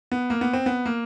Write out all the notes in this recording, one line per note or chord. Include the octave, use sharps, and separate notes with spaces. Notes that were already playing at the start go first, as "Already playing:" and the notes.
B3
A#3
B3
C4
B3
A#3